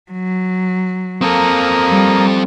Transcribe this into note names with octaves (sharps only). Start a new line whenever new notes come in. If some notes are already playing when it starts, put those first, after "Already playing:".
F#3
A#3 C4 A4 A#5 D#6
G3